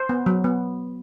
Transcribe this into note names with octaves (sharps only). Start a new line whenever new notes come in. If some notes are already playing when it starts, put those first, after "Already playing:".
Already playing: C5
B3
F#3
B3